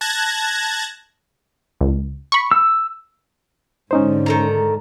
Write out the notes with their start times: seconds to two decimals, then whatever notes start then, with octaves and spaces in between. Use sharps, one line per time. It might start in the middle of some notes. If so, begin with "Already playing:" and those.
0.01 A5 F#6 G#6 A#6
1.81 C#2
2.32 B5 C#6
2.51 E6
3.91 G#2 D3 C#4 D#4 C5
4.26 D#3 A4 A#5